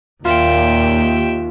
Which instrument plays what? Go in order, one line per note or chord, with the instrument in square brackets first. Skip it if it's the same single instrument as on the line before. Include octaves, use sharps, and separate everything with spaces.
[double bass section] D#2 [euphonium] A#2 [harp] F4 [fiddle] E5 G5